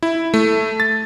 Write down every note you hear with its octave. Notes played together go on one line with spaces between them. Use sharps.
E4
A3
A6